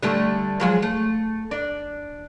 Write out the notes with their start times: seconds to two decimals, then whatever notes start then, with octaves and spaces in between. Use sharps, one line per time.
0.03 D3 G3 A3
0.60 F3 F#3 G#3
0.82 A3
1.51 D4